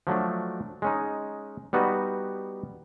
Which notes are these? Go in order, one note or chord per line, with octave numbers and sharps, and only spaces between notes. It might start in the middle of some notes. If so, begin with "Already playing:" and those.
F3 F#3 A3 D4
G#3 C#4 D#4
G3 B3 D#4 F#4 B4